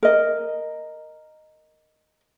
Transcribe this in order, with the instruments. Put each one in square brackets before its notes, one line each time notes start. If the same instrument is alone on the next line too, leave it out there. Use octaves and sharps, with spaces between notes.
[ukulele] A#4 D#5